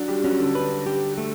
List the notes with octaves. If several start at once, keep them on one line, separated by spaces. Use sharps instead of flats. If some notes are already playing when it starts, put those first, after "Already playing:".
Already playing: F#3 D4 F#4
G3 G4
F#3 C#4 F#4
D3 D4
B4
G4
A3